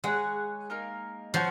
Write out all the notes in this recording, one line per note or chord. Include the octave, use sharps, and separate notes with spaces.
G#3 G#4 C#5 F#5
A#3 D#4 A#4
F3 C#4 F#4